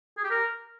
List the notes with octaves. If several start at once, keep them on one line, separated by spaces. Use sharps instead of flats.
G#4
G4
A#4